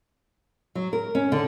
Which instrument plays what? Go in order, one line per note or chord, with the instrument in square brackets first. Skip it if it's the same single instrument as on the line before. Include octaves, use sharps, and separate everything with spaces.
[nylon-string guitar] F#3
A#4
C#4
D3